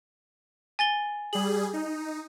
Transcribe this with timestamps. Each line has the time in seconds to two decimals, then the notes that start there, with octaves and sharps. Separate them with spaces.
0.79 G#5 A6 G7
1.33 G3 G#4 F#7
1.73 D#4